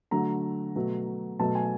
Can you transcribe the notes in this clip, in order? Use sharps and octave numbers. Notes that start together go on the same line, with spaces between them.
D3 F#3 A3 A#5
B2 F#3 A3
B2 F#3 A3 A5
G#5